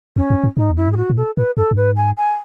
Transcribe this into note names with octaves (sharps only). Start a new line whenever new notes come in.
E2 C#4
F#2
G#2
G#2 D#4
E2
F#2 E4
G#2
G#4
A2 F#4
A2
B2 A4
A2 B4
F#2 A4
F#2
G#2 B4
G#5
G#5